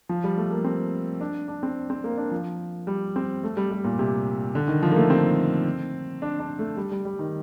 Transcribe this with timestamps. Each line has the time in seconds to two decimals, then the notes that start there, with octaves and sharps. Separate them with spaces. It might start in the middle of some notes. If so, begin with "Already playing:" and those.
0.09 F3
0.24 G3
0.38 A3
0.51 A#3
0.65 C4
1.21 D4
1.48 D4
1.63 C4
1.90 C4
2.04 A#3
2.18 D4
2.31 F3
2.87 G3
3.16 C4
3.43 A3
3.57 G3
3.71 G3
3.84 A#2
3.99 C3
4.55 D3
4.68 D#3
4.83 F3
4.91 A#3
4.96 A3
5.10 C4
6.22 D4
6.40 D4
6.59 A3
6.77 G3
6.92 G3
7.05 G3
7.19 D#3